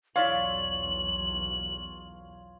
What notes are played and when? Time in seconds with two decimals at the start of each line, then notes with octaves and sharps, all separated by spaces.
0.16 B1 E2 E4 F4 C#5 D5 F5 F#7